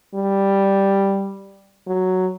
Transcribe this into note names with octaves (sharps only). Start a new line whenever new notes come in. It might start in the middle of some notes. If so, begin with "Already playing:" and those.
G3
F#3